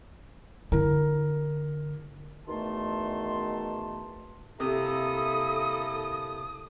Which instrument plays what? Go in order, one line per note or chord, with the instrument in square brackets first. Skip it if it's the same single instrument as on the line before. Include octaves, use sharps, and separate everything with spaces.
[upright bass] D3 E4 [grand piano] A#4
[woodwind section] E2 B2 D#3 A3 A5 C6
[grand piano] C3 [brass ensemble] A#3 E4 A4 [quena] D#6